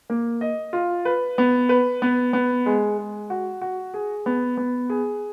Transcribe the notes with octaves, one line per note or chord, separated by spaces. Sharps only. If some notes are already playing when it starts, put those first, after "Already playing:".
A#3
D#5
F4
B4
B3
B4
B3
B3
G#3
G#3
F#4
F#4
G#4
B3
B3
G#4